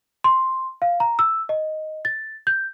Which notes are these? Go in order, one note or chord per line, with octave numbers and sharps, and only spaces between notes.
C6
F5
A#5
E6
D#5
A6
G6